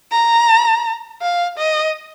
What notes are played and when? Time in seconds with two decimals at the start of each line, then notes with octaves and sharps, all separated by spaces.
0.12 A#5
1.22 F5
1.58 D#5